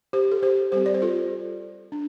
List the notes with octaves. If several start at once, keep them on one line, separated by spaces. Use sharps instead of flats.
G4 C5
A4
G4 C5
G3 C4 G4 C5
D5
C5
F4 A4
D4